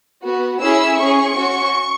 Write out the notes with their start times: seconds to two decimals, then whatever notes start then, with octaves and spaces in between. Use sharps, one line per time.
0.24 B3 F#4
0.62 C#4 E4 G#4 E6
0.99 C#4 G#4 C#6
1.37 C#4 F#4